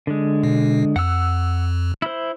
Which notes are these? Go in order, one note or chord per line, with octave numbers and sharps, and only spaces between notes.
D3 G#3
B2
F2 F#5 E6
E4 C5